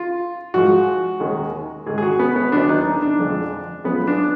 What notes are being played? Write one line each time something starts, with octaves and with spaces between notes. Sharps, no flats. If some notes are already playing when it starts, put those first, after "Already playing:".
Already playing: F4
G#2 F3 G#3 F#4
D#2 D#3 G#3
G#2 D#3 G#3 G#4
G#4
F#4
B3
B3
D#2 D#3 F#3 D4
D#4
D4
D4
F2 D3 F3 G#3
F#2 F3 G#3 B3
D4